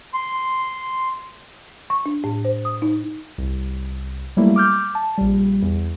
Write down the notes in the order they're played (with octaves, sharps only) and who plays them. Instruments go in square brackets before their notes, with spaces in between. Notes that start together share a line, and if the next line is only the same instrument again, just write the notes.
[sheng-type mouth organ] C6
[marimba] C#6
D4
A2
C5
D#6
D#4
[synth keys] C2
F#3 G3 A3 A#3 E4
D6 F6 G6
A5
A#1 G3
E2